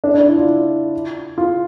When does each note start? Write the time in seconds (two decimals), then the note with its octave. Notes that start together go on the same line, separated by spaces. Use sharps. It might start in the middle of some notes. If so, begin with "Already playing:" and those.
0.04 D4
0.14 D4
0.26 E4
0.37 F4
1.38 F4